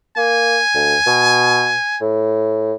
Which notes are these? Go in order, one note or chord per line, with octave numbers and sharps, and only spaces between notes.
A#3 G#5
D2
B2
A2